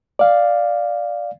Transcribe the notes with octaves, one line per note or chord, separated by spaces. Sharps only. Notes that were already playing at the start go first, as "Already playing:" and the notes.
D5 F5